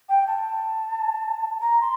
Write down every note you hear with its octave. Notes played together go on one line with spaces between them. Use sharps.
G5
A5
A#5
C6